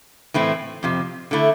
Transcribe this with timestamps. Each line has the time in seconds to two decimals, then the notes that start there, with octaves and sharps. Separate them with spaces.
0.34 A2 E3 A3 C4 E4
0.83 F2 C3 F3
1.31 D3 A3 E4